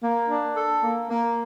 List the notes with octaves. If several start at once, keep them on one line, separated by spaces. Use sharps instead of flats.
A#3
D4
A4
A#3
A#3